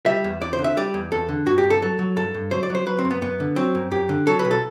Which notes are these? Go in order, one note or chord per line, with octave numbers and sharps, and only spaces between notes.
G3 E5
E2
E2 D5
C5
D3
E5
G3 D5
E2
E2 A4
D3
G2 F#4
G4
G2
A4
F#3 A4
F#3
G2 A4
G2
F#3 C5
D5
F#3 C5
F#3 B4
C4
F#2
B3
F#2 B3
D3
F#3 C4
F#2
F#2 G4
D3
F#3 A4
B4
B1
A4